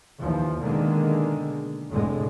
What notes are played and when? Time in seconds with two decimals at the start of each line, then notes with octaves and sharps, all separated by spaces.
0.21 D#2 E3 F3
0.63 B2 D3 D#3 G#3 A#3
1.91 F1 A2 D3 G#3